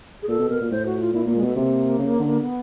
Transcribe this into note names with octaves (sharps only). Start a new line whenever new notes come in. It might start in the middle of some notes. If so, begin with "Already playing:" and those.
G#4
A#2 A4
B2
B2 A#4
A#2
A2 C5
F#4
F4
A#2 E4
A#2 A#3
G#3
B2 A3
C3 A#3
C#3
D3
B3